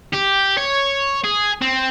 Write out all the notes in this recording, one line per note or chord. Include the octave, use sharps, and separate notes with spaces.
G4
C#5
G#4
C4